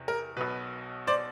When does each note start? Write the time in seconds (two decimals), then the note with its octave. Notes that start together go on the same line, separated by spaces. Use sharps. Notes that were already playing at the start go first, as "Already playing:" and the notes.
Already playing: E2 C3
0.08 A#4
0.37 B1 B2 B4
1.07 C5 D5